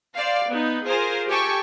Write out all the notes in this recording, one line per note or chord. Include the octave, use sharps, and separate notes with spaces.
C5 D5 F5
B3 D#4
F4 G#4 A#4 C5
G4 A4 G5 G#5 C#6